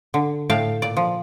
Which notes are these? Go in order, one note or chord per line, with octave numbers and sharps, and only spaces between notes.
D3
A2 F5 G5 A5
A#2 D5
F3